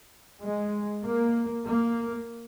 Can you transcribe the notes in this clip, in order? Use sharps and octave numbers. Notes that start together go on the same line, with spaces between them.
G#3
A#3
A#3